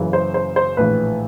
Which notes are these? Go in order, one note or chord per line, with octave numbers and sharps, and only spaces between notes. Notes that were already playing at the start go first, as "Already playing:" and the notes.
Already playing: F#1 F#2 C#3 E3
C5
C5
C5
A#1 A2 E3 B4